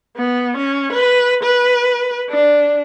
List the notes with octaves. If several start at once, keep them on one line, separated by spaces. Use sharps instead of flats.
B3
C#4
B4
B4
D4